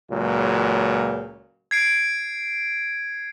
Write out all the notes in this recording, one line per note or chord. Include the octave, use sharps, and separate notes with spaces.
C#2 A#2 F#3
G#6 C7 D7